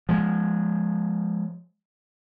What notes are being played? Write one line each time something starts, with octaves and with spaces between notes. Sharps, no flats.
F3 G#3